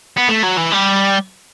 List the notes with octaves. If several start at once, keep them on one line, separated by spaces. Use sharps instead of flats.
B3
A3
F#3
E3
G3